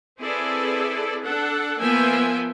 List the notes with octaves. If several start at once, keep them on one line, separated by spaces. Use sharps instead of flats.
C4 E4 G#4 A4 B4 D5
D4 A4 F#5
F3 A#3 B3 E5 G5 G#5